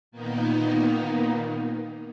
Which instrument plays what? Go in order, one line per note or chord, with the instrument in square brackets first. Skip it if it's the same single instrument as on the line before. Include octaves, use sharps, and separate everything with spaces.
[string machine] A#2 D#3 A#3 B3 D#4